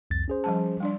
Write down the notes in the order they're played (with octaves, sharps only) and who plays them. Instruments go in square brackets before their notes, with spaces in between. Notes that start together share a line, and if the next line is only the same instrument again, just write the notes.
[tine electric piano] C2 F2 A6
C#4 G#4 C5
[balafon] F3 G3 A5
G3 D4 D5